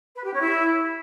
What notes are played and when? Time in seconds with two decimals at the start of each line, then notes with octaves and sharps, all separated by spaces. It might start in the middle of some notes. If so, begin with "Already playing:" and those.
0.15 B4
0.24 G4
0.32 C#4
0.41 E4